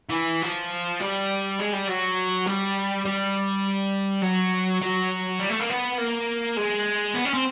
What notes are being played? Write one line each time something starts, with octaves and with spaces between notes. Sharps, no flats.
E3
F3
G3
G#3
G3
F#3
G3
G3
F#3
F#3
G3
A3
A#3
B3
A#3
G#3
B3
C#4
C4